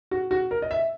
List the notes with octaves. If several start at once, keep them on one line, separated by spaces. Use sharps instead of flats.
F#4
F#4
A#4
D#5
E5